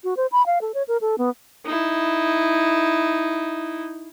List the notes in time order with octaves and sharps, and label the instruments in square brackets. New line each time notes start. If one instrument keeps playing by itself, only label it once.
[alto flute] F#4
C5
B5
F5
A4
C#5
A#4
A4
B3
[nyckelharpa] D#4 E4